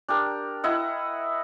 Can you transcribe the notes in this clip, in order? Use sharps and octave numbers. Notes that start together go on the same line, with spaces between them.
D4 G4 A#4
E4 D#5 F#5